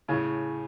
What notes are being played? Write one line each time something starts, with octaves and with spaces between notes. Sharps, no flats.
A2 C#3